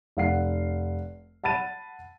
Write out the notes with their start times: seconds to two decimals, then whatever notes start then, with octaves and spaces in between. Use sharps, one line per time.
0.17 F1 F5 F#5 C7
1.44 F#5 A5 B5 A6 D#7